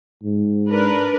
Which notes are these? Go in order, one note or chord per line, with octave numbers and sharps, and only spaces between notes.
G#2
D4 A#4 B4